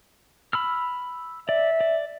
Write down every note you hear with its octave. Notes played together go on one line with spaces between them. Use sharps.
B5 E6 F6
D5 E5
D5